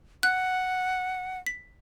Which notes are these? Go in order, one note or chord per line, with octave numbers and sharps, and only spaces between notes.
F#5 F#6
B6